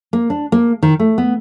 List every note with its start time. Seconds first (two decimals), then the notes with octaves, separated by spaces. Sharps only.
0.13 A#3
0.30 D4
0.52 A#3
0.83 D#3
0.99 A3
1.18 B3